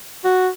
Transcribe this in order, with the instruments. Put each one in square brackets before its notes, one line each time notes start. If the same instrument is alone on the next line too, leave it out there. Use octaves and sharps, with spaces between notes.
[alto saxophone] F#4